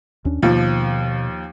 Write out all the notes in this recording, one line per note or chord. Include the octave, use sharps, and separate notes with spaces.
D#2 C#4 D4
D#2 B2 F3